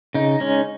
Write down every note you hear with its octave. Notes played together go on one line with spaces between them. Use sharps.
C#3 D#4
G#3 C#4